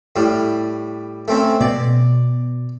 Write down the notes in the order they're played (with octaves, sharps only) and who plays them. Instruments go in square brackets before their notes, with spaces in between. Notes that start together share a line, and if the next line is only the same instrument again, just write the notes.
[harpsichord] A2 G3
A3 C4 C#4
[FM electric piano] B2 [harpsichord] D5